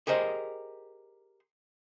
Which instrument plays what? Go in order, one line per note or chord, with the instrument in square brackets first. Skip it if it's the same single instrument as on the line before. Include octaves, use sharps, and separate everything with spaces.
[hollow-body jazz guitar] G4 G#4 A#4 C5 D#5